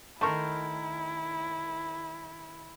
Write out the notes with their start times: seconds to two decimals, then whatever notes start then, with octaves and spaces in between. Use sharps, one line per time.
0.21 D#3 A3 E4 A#4 C5 C#6